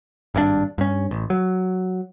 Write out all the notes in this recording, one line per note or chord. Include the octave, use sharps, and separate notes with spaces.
G#1 G2 D3 D4
G2 C#4
A1
F#3